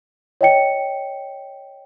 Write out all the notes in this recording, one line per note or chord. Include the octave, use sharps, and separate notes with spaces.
C#5 D#5 G5 C#7